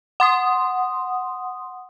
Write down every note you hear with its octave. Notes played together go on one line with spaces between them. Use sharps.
F#5 C6 D#6